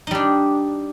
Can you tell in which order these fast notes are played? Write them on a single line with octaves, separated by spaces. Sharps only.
D#4 G3 D4